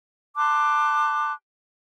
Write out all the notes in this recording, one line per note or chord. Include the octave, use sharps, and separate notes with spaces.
A5 C6 D6 F#6